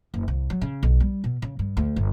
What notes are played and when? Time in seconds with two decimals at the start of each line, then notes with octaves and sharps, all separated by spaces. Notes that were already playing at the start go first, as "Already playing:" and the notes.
0.14 F#1
0.28 C2
0.50 F#3
0.61 C#3
0.83 B1
1.00 G3
1.24 B2
1.42 C#3
1.59 G2
1.77 D2
1.96 G1